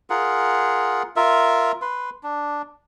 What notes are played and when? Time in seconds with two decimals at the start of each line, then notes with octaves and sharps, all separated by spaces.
0.10 F4 G#4 A#4 F#5
1.16 F4 A#4 E5
1.82 B4 C6
2.23 D4